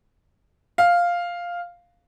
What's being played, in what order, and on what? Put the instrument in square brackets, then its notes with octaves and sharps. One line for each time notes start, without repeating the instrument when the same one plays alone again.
[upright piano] F5